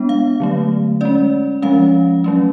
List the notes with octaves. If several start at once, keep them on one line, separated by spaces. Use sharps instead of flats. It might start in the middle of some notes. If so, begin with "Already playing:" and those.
Already playing: G#3 B3 D4
F5
D3 F#3 A3
G#3 C#4 D5
F3 G#3 C#4 F5
F#3 A3 C#4